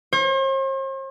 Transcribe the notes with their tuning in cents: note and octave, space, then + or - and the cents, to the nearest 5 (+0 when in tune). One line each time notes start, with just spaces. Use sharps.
C5 +45